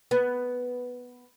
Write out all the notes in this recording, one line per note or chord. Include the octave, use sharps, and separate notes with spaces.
B3